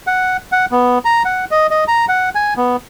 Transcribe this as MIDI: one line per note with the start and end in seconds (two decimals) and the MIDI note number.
0.07 0.37 78
0.52 0.66 78
0.72 0.98 59
1.05 1.23 82
1.25 1.45 78
1.51 1.67 75
1.70 1.84 75
1.88 2.05 82
2.09 2.30 78
2.35 2.54 80
2.57 2.76 59